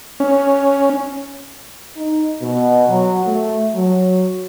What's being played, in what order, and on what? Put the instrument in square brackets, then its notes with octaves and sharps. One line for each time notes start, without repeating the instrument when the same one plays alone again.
[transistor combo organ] C#4
[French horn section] D#4
B2
F#3
A3
F#3